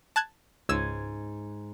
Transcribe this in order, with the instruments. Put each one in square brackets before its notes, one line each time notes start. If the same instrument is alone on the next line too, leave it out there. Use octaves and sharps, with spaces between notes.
[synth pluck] A5 F#6 G#6
[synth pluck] C#2 E6 [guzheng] G#2 G#5